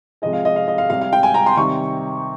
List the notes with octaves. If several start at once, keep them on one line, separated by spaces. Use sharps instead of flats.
C3 F3 G#3 D#5
F5
D#5
F5
D#5
F5
C3 G3 F5
F5
G5
G#5
A#5
C6
C3 D#3 G3 C#6